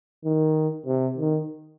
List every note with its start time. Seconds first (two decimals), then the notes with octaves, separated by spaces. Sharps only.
0.25 D#3
0.86 C3
1.18 D#3